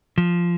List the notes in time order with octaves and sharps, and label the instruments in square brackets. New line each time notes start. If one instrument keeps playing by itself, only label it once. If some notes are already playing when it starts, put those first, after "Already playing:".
[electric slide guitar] F3